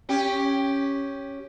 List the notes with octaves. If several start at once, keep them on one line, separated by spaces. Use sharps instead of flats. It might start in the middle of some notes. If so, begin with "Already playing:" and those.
C#4 G4